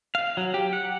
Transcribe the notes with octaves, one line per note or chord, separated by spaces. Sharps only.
F5
F#3
G4
F#5